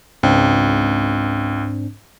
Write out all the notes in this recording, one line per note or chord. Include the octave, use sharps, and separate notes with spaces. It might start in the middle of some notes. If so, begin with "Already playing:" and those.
C#2 G#2 C4 D4